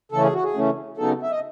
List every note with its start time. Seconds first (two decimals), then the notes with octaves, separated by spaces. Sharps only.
0.12 C#3 E3 A3 C#4 A4
0.23 G#4
0.33 F#4
0.44 G#4
0.54 C#3 E3 A3 C#4
0.97 C#3 F#3 B3 D#4 A4
1.23 E5
1.32 D#5